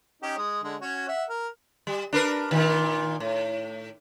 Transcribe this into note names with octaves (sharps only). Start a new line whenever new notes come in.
C#4 D#4 G4
G#3 D#6
D3 G#3
C#4 F#4 C#5
E5 F#5
A#4
G3
D4 A#4 B4
A#2 D#3
A2